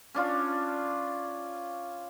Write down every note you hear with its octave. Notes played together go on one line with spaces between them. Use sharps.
C#4 D4 F4